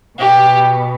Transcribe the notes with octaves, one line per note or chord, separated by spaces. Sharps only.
B2 G4